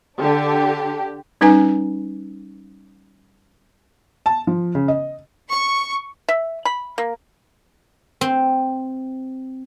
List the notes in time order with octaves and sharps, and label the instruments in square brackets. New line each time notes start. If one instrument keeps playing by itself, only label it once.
[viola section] D3 [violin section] D4 G4
[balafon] G3 C#4 D#4 B4 G#5
[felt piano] A5
F3
C#3
D#5
[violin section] C#6
[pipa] E5
B5
A#3
[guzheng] C4